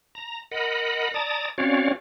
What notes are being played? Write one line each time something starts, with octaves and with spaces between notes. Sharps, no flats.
A#5
A#4 D#5 F#5 B5
D5 A5 A#5 D#6
C4 C#4 F#4 C#5 D5 F5